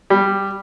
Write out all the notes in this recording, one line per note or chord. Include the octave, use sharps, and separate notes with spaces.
G3